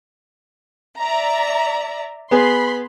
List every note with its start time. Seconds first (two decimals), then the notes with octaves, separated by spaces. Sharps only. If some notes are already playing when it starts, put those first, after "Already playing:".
0.98 D5 E5 A#5
2.31 B3 G#4 B4 B5 C6